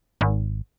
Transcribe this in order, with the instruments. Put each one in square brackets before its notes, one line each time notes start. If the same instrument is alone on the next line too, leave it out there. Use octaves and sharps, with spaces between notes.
[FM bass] G#1